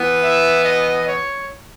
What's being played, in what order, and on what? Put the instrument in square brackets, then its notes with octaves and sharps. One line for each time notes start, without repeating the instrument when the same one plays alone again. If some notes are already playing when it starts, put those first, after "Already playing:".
Already playing: [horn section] E3 B3
E5
D#5
C#5